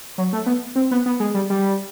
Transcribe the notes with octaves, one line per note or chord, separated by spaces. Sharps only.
F#3
A3
B3
C4
B3
B3
G#3
G3
G3